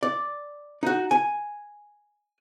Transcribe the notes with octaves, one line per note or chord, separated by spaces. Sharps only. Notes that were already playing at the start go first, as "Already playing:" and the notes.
D5
D#4 F#4
G#5